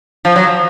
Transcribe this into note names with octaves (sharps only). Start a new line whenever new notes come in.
F3
F#3
F3